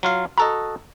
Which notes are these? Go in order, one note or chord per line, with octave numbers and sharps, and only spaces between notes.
F#3 F4 F5
F#4 A4 D#5 A#5